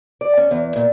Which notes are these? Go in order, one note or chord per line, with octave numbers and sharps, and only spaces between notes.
D5
C#4
E2
A#2